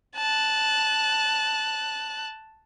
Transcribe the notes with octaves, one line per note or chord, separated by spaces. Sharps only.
A5 F#6